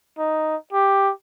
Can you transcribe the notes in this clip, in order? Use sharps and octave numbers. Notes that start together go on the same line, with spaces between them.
D#4
G4